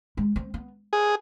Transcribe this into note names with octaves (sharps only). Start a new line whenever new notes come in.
G#3
C4
B3
G#4